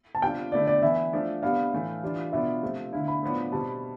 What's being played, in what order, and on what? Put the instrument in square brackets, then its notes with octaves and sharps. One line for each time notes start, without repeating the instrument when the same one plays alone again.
[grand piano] A5
[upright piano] C3 G3 D4 F4 [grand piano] G5
[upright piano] D3 A3 E4 [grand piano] D5
[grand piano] D5
[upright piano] E3 B3 E4 [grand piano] E5
[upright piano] F3 A3 D4
[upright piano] C3 G3 B3 D4 [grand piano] F5
[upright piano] A2 E3 A3
E3 G3 D4 F4
[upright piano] B2 B3 D4 F4 [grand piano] E5
[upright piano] C3 F3 A3 C4
[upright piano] D3 A3 E4 [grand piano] F5
[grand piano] B5
[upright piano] A2 F3 B3 D4
[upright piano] B2 G3 C4 [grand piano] A5